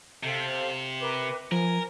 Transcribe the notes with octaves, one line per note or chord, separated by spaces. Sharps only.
C3 A4 C5 F5
A#4 B4 D6
F3 A#4 G#5